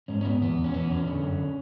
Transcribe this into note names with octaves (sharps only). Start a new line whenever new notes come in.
G#2 C#4
C#4
G#2 B3
E2 B3
E2
C#4
E2 B3
E2 C#4
D3
F#2